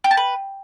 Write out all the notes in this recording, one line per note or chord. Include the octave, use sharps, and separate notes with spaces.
G4
A5
B4